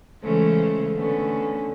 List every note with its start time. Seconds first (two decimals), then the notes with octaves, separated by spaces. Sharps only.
0.22 C#3 E3 G#3 A3 C#4 C5
0.94 D3 A3 B3 C#4